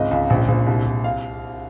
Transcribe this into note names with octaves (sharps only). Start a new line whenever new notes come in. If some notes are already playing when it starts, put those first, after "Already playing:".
Already playing: G#1 C#2 D#5
C#2
A#1
A#1
C2
C2
F5